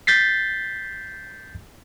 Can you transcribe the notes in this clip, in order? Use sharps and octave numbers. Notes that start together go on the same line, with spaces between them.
G6 A6 B6 C7